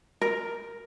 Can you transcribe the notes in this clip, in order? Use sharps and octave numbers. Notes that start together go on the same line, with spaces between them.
A#4